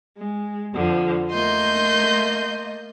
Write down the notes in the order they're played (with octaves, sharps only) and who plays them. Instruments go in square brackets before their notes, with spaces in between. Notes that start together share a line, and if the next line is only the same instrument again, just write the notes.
[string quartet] G#3
F2 D3 F3
[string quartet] A3 A#3 D#5 [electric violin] C6 G6